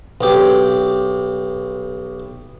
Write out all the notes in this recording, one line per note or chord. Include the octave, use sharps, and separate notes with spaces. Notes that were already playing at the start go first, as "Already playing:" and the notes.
B1 G4